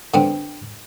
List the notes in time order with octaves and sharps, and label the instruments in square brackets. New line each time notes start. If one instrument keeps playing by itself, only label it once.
[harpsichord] D3 B3 C4